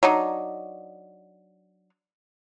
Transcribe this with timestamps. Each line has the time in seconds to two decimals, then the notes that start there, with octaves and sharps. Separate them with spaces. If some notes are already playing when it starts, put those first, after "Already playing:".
0.03 F#3 D4 D#4